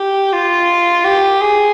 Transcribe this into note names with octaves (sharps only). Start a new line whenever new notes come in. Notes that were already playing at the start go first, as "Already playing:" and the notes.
Already playing: G4
F4
G4
G#4